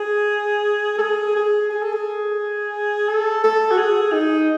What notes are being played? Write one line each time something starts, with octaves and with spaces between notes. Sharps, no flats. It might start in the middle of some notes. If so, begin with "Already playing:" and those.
Already playing: G#4
A4
G#4
G#4
G#4
A4
G#4
A4
A4
F#4
G#4
D#4